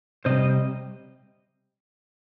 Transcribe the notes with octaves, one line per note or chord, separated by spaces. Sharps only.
C3 G3 C5 D#5